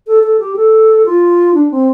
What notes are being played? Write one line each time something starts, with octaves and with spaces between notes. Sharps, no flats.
A4
A4
G4
A4
F4
D4
C4